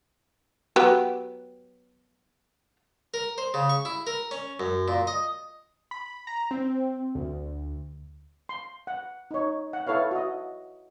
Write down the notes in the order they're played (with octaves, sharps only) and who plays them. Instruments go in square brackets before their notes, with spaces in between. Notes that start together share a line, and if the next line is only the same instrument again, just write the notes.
[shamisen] F#3 B3 G4
[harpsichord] A#4
C5
C#3
C#6
E4
A#4
C#4
F#2
A#2
D#5
[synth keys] B5
A#5
C4
D2
[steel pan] C6
F#5
D#4 C#5
F#5
E4 A4 B4 C#5 F5
F#4 D#5